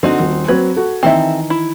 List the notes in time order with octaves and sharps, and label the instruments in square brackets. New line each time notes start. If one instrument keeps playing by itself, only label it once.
[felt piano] D3 [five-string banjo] C4 D#4 F#4
[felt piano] D#1
[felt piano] F#3 C4 G#6 [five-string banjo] B4
[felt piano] F#4 A4
[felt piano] D#3 E3 [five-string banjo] C4 A4 E5
[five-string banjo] E4